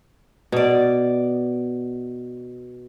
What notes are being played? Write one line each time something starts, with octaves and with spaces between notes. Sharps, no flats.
B2 D5